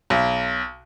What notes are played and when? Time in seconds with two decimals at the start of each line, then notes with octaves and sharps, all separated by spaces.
0.10 B1